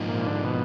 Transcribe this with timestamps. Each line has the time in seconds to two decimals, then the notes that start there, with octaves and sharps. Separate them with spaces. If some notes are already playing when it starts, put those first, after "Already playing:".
Already playing: G#2 F3 A#3 D#4
0.08 A#2
0.26 D3
0.44 B2